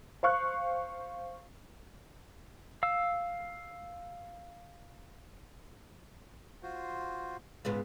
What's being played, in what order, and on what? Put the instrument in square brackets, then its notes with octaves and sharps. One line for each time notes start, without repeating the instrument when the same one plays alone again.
[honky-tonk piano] C5 F5 C#6 F#6
[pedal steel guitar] F5 E6
[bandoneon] F4 F#4 C5
[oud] G#2 C#3 B3 [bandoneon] F4 B4